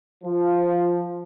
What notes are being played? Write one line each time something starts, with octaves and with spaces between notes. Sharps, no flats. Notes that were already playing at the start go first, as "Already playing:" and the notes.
F3